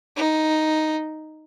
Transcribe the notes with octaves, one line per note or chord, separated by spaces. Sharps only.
D#4